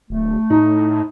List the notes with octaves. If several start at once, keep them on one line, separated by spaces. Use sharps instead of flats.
D1 A3
A2 D#4